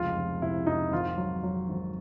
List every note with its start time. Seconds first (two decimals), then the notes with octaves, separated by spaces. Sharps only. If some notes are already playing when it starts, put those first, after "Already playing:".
Already playing: F1 C#2 F4
0.16 F1
0.42 C3 E4
0.67 F1 D#4
0.92 G#1 F4
1.17 F#3
1.43 F#3
1.69 G#1